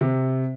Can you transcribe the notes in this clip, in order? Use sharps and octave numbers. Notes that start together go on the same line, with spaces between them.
C3